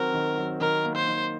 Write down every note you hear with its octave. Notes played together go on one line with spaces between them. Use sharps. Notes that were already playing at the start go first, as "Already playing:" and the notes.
Already playing: D#3 F#3 C4 F#4 A#4
D#3
F#3
D#3 A#4
A#3
C5
D#3